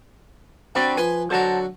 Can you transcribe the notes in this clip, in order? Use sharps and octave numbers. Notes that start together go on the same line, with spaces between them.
C4 D4 F#4 D5 B5
F3 B4 G#5 B5 C6
D3 F#3 F#4 C5 A5 A#5